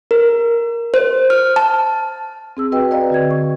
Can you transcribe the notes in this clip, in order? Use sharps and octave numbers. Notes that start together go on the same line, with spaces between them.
A#4
C5
F6
A5
C4 G#4 E6
C4 F#4 B4 D#5 G5
B4 D5 D#5 F5 G5 A#5
D3 F#4 G#6
C#6